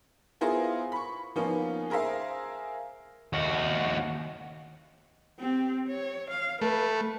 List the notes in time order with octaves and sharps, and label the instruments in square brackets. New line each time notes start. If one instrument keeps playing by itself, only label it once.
[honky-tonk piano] B3 E4 F4 G#4 A#4 C5
B5 C#6
F3 A#3 B3 C#4 D#4 F4
G#4 A#4 C5 E5 F5
[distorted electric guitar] D#2 F#4
[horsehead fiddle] C4 G4
C#5
F5
[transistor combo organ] A3 [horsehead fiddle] B4